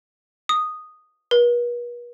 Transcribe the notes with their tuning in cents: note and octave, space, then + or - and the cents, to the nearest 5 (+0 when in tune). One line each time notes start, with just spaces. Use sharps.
D#6 -5
B4 -45